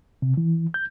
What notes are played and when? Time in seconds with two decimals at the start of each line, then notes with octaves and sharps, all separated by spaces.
0.22 C3
0.37 E3
0.74 G6